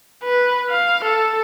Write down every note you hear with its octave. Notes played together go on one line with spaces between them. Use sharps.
B4
F5
A4